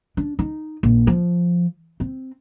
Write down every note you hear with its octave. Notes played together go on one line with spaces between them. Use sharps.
D4
D#4
A#1
F3
C4